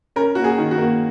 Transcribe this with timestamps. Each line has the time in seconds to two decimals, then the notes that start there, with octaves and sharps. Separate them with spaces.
0.16 C#4 A#4
0.35 A#3 F#4
0.44 G#4
0.58 D#3
0.71 F#4
0.78 A#3